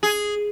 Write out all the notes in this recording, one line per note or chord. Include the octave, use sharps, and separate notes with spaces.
G#4